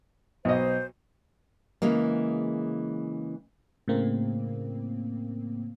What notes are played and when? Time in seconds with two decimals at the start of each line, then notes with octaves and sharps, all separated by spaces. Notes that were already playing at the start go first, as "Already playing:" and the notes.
0.45 B1 C5 D#5
1.82 C#3 E3 G#3 A#3
3.88 A2 C#3 A#3 C4